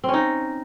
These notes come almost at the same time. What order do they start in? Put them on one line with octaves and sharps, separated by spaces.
C4 C#4 D#4